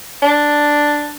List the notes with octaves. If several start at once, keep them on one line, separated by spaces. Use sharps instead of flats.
D4